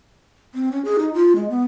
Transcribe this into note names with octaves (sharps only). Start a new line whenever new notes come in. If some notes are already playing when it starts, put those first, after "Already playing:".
C4
C#4
G#4
D#4
F4
G#3
B3